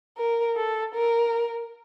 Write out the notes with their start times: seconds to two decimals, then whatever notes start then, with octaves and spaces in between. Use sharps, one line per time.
0.18 A#4
0.56 A4
0.95 A#4